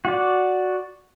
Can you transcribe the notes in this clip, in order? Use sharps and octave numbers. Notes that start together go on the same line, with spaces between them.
F#4 D5